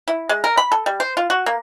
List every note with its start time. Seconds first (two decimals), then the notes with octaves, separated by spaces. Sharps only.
0.08 E4
0.29 G#3
0.44 A#4
0.57 B5
0.72 A4
0.86 G3
1.00 C5
1.17 F4
1.30 F#4
1.46 A#3